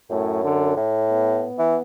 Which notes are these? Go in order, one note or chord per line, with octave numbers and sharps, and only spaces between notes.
F#2 A2
D3
A2
B3
E3